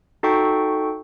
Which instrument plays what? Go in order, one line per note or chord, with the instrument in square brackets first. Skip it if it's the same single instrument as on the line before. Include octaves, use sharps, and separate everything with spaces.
[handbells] D#4 F#4 A4 G5 C#6